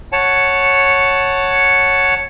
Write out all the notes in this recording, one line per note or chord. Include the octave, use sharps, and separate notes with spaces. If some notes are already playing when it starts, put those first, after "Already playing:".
C#5 F#5 A5